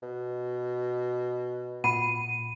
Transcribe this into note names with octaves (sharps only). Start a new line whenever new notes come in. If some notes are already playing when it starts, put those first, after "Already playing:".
B2
A#2 F#5 B5 D#7